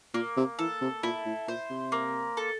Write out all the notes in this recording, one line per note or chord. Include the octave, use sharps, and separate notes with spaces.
A#2 A#3
C3
E3 A4
C3
A#2 E4
A2
A#2 C5
C3
A#3
A4